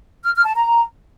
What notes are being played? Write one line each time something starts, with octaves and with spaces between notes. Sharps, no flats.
F6
F6
A5
A#5